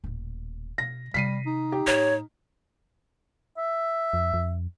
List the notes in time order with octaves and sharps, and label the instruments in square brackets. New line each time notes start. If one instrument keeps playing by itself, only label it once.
[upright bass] D#1 A2
[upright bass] B2 [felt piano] A#6
[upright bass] C3 D#3 [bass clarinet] G3 [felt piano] B6 C7 D#7
[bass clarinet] D#4
[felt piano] G4
[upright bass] A2 [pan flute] C#5
[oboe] E5
[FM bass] F2
F2